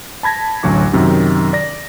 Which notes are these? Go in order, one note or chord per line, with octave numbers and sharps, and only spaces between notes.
A5 B5 G#6 A#6
A1 D2 F#3 F#4 D6
F#2 C3 D#3 F#3
D5 A#6